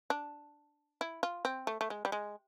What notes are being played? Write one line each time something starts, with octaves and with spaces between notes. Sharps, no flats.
D4
E4
F4
C4
A3
A3
G#3
G3
G#3